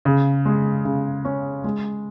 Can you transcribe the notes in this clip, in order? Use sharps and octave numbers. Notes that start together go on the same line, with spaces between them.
C#3
G#3
C#3
C#4
G#3